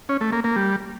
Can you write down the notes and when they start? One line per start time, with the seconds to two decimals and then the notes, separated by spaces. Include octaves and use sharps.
0.09 C#4
0.21 A3
0.32 A#3
0.44 A#3
0.56 G3